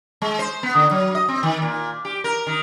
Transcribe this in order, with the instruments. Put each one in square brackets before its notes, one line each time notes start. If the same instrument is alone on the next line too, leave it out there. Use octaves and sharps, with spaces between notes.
[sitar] G#3
C5
B3
D3
F#3
D#5
C4
D#3
A#2
G4
A#4
D#3